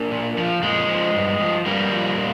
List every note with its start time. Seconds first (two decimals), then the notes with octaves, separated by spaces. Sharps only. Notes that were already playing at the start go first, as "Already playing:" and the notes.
Already playing: A#3 D4
0.11 A#2
0.37 F3
0.63 A#2 G#3
0.88 F3
1.14 G2
1.40 F3
1.66 G2 G3 A#3
1.92 F3
2.18 A#2